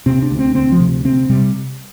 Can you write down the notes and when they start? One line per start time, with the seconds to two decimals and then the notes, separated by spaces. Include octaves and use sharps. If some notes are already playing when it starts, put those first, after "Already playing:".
0.06 C3 C4
0.22 D4
0.31 D2
0.39 C4
0.55 D2 C4
0.72 F3
0.80 C3
1.05 C3 C4
1.29 C3 G3